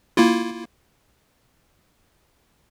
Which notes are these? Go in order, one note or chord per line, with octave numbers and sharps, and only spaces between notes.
A#3 E4 F4